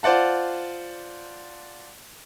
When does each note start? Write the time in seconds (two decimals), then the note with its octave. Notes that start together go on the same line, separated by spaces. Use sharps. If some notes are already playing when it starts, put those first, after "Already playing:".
0.03 F4 C5 D5 F#5 A5